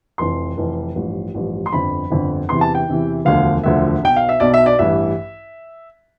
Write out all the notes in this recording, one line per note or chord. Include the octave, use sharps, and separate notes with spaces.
F1 F2 E3 C6
F1 F2 E3
A1 G2 F3
A1 G2 F3
C6
G1 F2 D3 B5
G1 F2 D3
E2 C3 E3 C6
A5
G5
E2 C3 E3
E1 D2 D3 F3 F5
E1 D2 D3 F3 E5
B1 B2 G5
F5
E5
B1 B2 D5
E5
D5
A1 G2 E3 E5